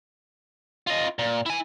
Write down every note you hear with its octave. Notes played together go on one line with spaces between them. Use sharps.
F4 D#5
A#2
E4 G#5